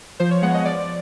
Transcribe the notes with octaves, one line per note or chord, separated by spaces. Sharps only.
F3 C5
C#5
G#3 B3 F#5
D#5
F3 D5